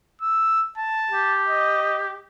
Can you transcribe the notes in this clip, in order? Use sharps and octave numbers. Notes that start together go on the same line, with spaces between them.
E6
A5
G4
D#5